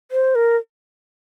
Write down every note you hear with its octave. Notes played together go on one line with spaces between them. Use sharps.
C5
A#4